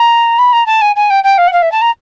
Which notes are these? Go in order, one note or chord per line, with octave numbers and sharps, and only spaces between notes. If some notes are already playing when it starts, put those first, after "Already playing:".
Already playing: A#5
B5
A#5
A5
G#5
G#5
G5
G5
F5
F#5
F5
E5
A5
A#5